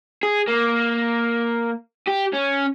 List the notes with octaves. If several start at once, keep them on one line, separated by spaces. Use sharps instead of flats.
G#4
A#3
G4
C#4